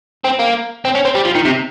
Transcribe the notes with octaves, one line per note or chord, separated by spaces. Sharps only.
C4
A#3
C4
C#4
C4
G3
F3
D#3
C3